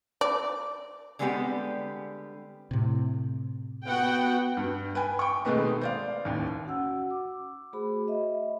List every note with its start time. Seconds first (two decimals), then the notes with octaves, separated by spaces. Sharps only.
0.21 D5
1.19 D3 G3 G#3 B3 C4 G4
2.71 A2 C3
3.86 B3 F#4 F#5 G5
4.57 G2
4.95 B4 G5 G#5
5.19 G5 C#6
5.45 B2 D#3 G#3 A3 B3 D#4
5.81 C5 D5 F5
6.25 A1 D#2
6.65 C#4 F#4 F#5 E6
7.11 D6
7.73 A3 F#4 G#4 C5 B5
8.08 D#5 E5